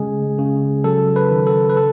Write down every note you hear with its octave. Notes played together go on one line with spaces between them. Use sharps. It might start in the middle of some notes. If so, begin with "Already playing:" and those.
Already playing: C#3 G#3 G#4
C#3
F#3 A4
B4
D#3
A4
B4
A4